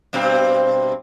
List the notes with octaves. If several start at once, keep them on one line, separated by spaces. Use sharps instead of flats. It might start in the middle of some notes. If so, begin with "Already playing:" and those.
G2 B2 C4